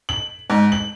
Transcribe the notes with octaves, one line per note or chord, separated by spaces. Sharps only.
F#7
G#2
F#7